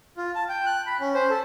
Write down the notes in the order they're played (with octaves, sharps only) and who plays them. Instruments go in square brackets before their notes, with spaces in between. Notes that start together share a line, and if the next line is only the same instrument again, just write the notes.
[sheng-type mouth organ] F4
A5
G5
F#6
B5
C#4
C5
A4